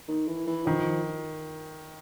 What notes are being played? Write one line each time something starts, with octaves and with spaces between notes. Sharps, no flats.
D#3
E3
E3
D#3 F3